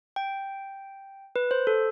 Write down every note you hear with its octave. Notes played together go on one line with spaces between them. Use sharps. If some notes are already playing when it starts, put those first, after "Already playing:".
G5
B4
C5
A4